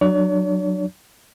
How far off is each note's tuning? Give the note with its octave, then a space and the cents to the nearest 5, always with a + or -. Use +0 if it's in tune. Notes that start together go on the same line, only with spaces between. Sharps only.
F#3 +0 D4 +30 C#5 +45